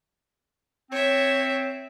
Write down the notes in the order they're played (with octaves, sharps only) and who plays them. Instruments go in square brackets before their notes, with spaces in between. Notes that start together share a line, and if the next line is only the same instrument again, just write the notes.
[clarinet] C4 [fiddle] C#5 E5